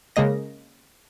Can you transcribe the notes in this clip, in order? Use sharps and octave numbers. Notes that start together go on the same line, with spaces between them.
C#3 G#3 A#3 D#5 A#6